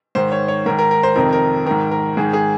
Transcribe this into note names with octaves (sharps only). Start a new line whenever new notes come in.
G#2 D#3 C5
C#5
C#5
G#2 D#3 A#4
A#4
A#4
C5
F2 C3 D#3 A#4
A#4
G#2 D#3 A#4
A#4
G#2 D#3 G#4
G#4